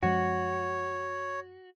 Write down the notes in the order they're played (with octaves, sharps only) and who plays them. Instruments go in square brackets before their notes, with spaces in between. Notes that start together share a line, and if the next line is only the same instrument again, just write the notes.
[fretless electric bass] F#2 F3 G#3 [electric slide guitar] F#4 [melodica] C#5